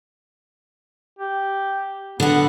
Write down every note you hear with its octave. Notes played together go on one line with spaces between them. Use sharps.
G4
D3 B3 F#5